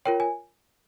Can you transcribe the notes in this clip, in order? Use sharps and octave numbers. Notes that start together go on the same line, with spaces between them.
F4 A#4 C#5 G5
G#5